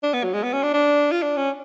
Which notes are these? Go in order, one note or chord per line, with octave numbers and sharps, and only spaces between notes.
D4
B3
F#3
G#3
B3
C#4
D4
D4
F4
D4
C#4